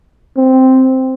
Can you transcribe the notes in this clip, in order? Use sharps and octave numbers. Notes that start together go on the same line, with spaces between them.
C4